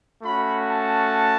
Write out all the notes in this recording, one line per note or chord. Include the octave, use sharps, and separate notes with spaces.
A3 C#4 F#4 B5
A5